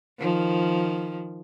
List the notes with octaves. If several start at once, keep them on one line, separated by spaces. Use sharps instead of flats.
D#3 F3